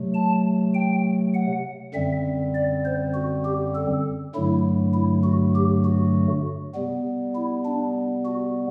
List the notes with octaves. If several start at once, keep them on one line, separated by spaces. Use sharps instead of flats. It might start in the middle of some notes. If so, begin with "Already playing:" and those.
Already playing: C3 F#3 A3
A5
G5
F#5
F#2 D3 G3 C4 E5
D5
C5
F#4
G4
A4
G2 D3 F#3 A3 E4
E4
F#4
G4
F#4
C3 G3 B3
E4
D4
F#4